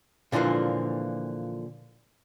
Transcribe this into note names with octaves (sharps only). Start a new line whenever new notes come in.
A#2 D3 E3 F3 A#3